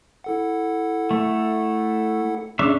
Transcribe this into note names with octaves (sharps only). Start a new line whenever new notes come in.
E4 A4 F#5
A3
C#4 D4 G#4 E5